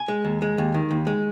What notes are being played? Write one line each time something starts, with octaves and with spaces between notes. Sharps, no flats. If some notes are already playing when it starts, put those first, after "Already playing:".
Already playing: G#5
G#3
D#2
G#3
D#2
D#3
D#2
G#3